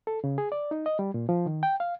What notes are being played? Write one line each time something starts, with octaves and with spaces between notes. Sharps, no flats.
A4
C#3
G#4
D5
D#4
D#5
G3
A#2
F3
D#3
G5
F5